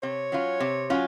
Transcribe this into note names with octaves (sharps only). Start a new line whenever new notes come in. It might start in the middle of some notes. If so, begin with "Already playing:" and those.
C3 C#5
F#3 C#4 F4
C3
F#3 C#4 F4